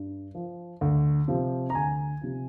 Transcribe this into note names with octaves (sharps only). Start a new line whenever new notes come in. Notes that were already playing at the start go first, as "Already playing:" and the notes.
Already playing: G2
F3
D2
C3 F3
A#5
D2 G#5
C3 F3